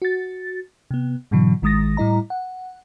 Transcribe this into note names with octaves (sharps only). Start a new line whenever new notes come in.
F#4 A6
C3 B3
G#2 B2 D3 E3 F#3
A1 D#3 G#3 D#6 A6 A#6
A2 G3 E4 D#5 A#5
F#5